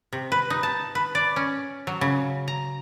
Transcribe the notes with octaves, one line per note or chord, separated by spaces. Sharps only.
C3
B4
D#4
A5
B4
D5
C#4
F#3
C#3
A#5